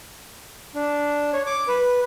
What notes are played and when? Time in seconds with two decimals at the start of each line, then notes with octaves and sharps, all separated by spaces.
0.75 D4
1.33 C#5
1.46 D6
1.68 B4